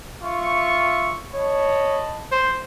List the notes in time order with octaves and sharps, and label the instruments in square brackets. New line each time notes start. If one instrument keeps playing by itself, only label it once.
[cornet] F4 [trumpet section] E5 C#6
[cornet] C#5 [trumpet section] D#5 A5 B5
[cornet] C5